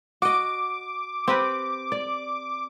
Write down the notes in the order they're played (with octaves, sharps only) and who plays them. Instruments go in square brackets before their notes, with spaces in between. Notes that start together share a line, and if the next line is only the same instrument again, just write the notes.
[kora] F#4 D#5 [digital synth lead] D6
[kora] C4 G4 B4
D5